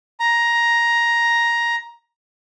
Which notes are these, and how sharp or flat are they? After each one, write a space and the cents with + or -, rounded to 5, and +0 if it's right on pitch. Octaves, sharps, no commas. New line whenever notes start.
A#5 +10